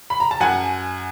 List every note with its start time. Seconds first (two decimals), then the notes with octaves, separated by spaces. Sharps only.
0.10 B5
0.20 A#5
0.31 A5
0.40 F#2 F#5 G#5